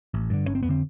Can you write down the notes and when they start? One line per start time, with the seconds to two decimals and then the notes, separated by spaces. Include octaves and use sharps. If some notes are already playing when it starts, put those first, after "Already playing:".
0.14 A1
0.30 G2 D3
0.47 G1 C#4
0.55 C4
0.63 F2 B3
0.69 D3 C4